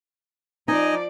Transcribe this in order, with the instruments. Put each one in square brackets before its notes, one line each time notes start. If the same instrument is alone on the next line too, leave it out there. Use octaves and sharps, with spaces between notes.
[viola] F3 D5 [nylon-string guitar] D#4 [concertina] D#5 G#5 A#5